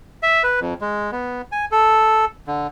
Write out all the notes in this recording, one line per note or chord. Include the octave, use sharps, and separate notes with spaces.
E5
B4
F2
G#3
B3
G#5
A4
D3